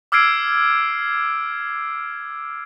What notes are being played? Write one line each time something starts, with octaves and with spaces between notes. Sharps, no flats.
D6 E6 F6 G#6 C7 D7